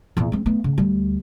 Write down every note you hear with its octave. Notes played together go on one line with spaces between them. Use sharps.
E2 A#2
G#3 C4
A3 B3
C#3
D2 G3